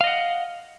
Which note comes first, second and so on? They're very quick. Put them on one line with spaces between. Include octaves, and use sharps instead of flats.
F5 D#5 F#5